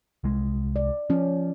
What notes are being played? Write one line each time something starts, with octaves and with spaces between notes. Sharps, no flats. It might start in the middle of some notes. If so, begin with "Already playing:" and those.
C2 G#3
D5
F3 C#4